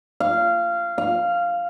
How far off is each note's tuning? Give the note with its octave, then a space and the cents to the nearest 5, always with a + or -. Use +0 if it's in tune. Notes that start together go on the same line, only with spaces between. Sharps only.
F5 -20
F5 +0